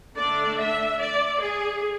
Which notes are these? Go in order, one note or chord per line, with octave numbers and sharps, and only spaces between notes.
D3 A3 D4 D5
E5
D5
G#4